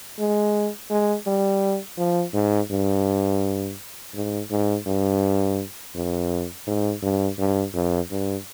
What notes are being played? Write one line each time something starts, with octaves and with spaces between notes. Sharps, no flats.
G#3
G#3
G3
F3
G#2
G2
G#2
G#2
G2
F2
G#2
G2
G2
F2
G2